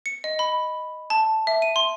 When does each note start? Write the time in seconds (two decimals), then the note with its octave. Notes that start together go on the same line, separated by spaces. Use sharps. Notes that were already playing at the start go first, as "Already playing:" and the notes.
0.06 C#7
0.24 D#5
0.39 B5
1.10 A5
1.47 E5
1.62 D#7
1.76 C6